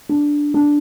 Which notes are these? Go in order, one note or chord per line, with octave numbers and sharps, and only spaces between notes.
D4
D4